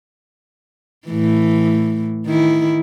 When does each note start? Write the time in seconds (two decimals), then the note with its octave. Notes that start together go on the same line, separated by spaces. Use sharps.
1.08 A2 E3
2.26 D#3 E4